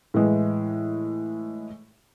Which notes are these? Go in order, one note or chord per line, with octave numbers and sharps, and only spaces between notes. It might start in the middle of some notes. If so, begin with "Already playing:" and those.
A2 E3 G#3